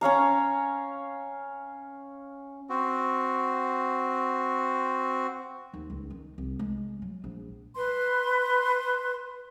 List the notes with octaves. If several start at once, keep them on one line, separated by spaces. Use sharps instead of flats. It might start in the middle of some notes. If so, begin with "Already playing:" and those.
C#4 C#5 F5 A#5
C4 F#4
D#2
C#2
D#3
C2
G#3
F#3
A#1
B4 C6